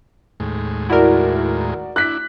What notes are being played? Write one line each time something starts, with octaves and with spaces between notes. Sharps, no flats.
D#2 A2 G#3
E4 F#4 A#4 D5
D4 E4 F#6 B6